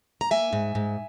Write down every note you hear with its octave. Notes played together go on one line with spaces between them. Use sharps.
A#5
A#3 E5 G#5
G#2
G#2